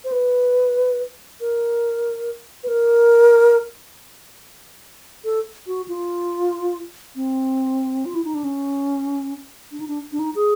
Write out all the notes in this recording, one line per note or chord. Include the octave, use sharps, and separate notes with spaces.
C5
B4
A#4
B4
A#4
A4
F#4
F4
C4
F4
E4
D#4
D4
C#4
D4
D#4
D4
D4
D#4
G#4